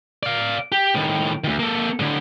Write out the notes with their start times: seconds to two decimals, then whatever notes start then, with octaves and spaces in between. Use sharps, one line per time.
0.23 D5 F5
0.72 G4
0.95 A2 D#3
1.44 D2 D#3
1.59 A#3 A4
2.00 A2 D3